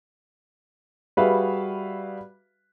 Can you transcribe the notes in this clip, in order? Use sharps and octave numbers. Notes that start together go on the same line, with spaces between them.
G3 F#4 G#4 B4 E5 F5